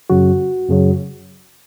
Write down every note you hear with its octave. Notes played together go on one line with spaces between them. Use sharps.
F#2 C#3 F#3 F#4
F#2 C#3 F#3